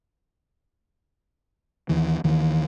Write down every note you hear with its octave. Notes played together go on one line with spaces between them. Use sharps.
D#2 E3
D#2 D#3 E3